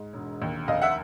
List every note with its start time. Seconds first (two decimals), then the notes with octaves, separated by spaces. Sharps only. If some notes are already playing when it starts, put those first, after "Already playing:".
Already playing: G#2
0.13 E1
0.42 D#2
0.68 F1 D#5 F5
0.82 E5 F#5